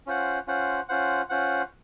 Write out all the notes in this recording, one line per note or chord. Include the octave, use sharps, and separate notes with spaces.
C#4 F4 C5 F#5
C#4 F4 C5 F#5
C#4 F4 C5 F#5
C#4 F4 C5 F#5